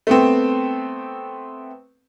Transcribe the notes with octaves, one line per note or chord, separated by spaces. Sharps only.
A3 B3 C4